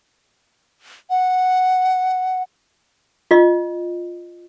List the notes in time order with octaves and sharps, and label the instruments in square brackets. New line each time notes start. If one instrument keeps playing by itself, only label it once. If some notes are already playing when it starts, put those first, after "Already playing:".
[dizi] F#5
[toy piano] F4 D#5